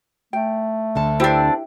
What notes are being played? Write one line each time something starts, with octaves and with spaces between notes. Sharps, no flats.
A3 G5
D2 D3 A5
C4 D4 E4 G4 B4